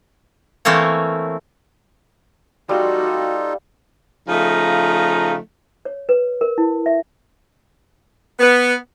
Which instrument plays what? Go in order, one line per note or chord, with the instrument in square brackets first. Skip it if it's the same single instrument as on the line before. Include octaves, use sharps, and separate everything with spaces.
[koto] E3 A3 A#3 C4 C#5
[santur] G3 F5 C6 [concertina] D#4 F4 A4 [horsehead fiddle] F#4
[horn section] C#3 F3 A3 D#4 F5 A#5
[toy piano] C#5
B4
A#4
E4
E5
[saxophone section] B3